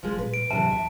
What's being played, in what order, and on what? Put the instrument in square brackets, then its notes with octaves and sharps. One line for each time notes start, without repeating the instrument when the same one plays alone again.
[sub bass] F1 [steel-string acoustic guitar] F3 G#3
[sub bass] A#2 [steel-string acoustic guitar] B4
[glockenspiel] D7
[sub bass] A2 [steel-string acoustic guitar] C3 D#3 E3 [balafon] F#3 [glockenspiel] A5
[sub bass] D#2 [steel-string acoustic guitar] E5